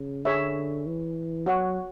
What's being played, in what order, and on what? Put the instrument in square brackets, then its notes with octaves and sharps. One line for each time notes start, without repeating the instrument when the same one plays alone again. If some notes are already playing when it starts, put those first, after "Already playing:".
Already playing: [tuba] C#3
[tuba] D3 [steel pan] G#4 C#5 E5
[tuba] E3
[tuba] F#3 [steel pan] F#4 C#5 F#5